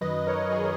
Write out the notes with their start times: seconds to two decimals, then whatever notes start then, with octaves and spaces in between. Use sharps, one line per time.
0.01 F#2 D#3 F#3 B4 D#5
0.27 A#4 C#5
0.52 G#4 B4